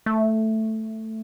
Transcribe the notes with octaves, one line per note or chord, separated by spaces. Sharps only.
A3